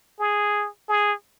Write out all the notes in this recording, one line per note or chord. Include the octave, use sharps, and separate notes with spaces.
G#4
G#4